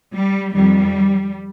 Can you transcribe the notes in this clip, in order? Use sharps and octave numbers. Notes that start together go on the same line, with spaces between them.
G3
F2 D#3 G3